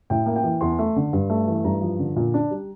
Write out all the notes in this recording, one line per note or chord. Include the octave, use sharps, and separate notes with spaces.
A2 G5
A#3
G5
E3
E2 C6
A3
D3
G2
A3
E3
G2 A#5
F3
D3
A#2
D4
G3